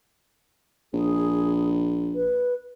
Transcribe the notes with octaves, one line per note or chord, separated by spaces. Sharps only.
A#1 G#4
B4